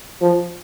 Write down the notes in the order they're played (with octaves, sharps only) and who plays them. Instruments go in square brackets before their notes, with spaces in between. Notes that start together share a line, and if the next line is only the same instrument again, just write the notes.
[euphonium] F3